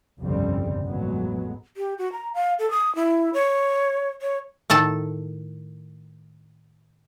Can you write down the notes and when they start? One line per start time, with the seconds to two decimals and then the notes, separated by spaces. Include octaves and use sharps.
0.20 G1 C2 F2 C#3 G3 C4
0.87 A1 F2 F#3 G#3 B3
1.77 G4
1.98 F#4
2.12 A#5
2.34 F5
2.59 A4
2.71 D#6
2.95 E4
3.34 C#5
4.22 C#5
4.70 A2 D#3 A4 A5